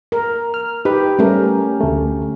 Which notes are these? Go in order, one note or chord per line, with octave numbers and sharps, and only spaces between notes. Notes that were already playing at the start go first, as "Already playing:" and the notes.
A#4
F6
D#4 G4 B4
G3 A3 C#4 A#4
D2 A3